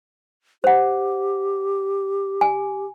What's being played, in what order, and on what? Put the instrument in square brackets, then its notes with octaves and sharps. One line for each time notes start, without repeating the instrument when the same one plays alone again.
[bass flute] G4 [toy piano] C5 F#5
[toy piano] G#5